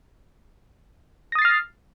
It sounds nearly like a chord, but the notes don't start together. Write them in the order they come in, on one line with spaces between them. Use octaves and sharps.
A#6 D#6 A6 C7 F6